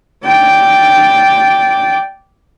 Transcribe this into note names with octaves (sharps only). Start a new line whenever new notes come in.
D5 G5